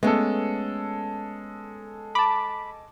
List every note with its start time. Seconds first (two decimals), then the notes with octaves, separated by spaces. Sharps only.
0.03 G#3 A3 B3 C#4 A4
2.15 A5 B5 D6